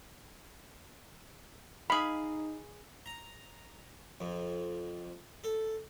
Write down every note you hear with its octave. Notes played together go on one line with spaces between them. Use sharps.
D#4 G#4 F5 B5
A#5
F2
A4